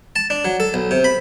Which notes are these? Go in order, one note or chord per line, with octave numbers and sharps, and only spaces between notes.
A5
D4
F#3
A4
B1
C3
B5